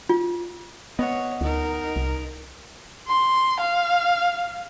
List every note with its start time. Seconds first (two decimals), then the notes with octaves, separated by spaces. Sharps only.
0.09 F4
0.99 B3 C#5 D#5 F#5
1.41 D2 D#4 A#4
1.96 C2
3.08 C6
3.60 F5